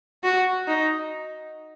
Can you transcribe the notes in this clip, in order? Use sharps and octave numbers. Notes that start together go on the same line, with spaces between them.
F#4
D#4